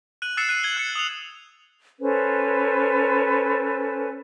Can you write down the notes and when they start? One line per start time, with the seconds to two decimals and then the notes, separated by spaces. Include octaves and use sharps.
0.22 F#6 D#7 F#7
0.37 E6 F#6 A6 C7 C#7 E7
0.49 F#6 D#7 E7
0.63 G#6 F#7 G7
0.77 F#6 C#7
0.95 D#6 F7
2.00 C#4 A4 B4 C5